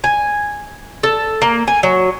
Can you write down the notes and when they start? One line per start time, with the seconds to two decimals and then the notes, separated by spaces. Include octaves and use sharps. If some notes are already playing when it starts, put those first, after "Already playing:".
0.04 G#5
1.03 A4
1.42 A#3
1.67 G#5
1.83 F#3